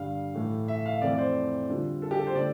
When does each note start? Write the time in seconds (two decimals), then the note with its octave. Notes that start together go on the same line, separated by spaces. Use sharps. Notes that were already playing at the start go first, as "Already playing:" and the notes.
Already playing: G2 D3 G3 F5
0.35 A2 E3 A3
0.68 E5
0.86 F5
1.02 F2 E3 A3 C4 D5
1.13 D5
1.18 C5
1.69 D3 G3 D4 F4
2.02 A4
2.11 G4
2.19 A4
2.27 C5
2.35 D3 A3 D4 D5